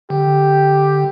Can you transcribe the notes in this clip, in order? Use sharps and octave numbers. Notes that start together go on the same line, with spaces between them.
D3 G4